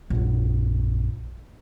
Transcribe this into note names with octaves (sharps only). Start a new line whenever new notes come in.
A#1 F#2